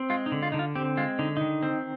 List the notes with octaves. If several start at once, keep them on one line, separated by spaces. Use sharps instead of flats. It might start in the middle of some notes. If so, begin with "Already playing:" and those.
Already playing: C4
G#3 F4
D#4
D3
F4
D3 D#4
F4
C4 G4
G#3 F4
D3 D#4
D#3 D#4
C4